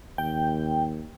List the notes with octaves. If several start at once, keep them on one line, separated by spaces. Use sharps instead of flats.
D#2 G5